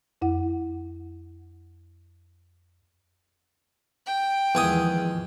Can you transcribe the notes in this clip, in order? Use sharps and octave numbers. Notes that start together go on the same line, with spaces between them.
F2 E4 F#5
G5
E2 D#3 F3 G#3 G#5 D#6